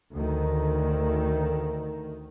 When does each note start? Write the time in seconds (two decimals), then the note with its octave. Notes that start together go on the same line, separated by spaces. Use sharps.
0.13 D2 D#3